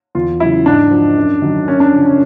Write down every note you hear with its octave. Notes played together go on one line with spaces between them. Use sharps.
E2 F4
C#3 F#3 E4
G#2 D4
F3
F#2
D#3 F#3
F#2 C#4
D4
C#3 F3
C#4